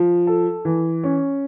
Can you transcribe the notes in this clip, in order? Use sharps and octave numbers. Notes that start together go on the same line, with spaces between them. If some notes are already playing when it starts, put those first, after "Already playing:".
Already playing: F3
A4
E3
C#4